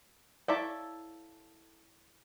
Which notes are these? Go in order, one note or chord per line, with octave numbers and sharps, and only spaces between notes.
E4 A4 C#5 D5 E5 F5